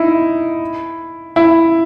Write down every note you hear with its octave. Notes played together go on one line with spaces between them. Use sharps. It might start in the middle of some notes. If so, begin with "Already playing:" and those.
Already playing: D#4 E4
E4